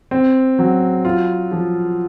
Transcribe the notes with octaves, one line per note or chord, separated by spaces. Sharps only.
C4
F#3
F4
F3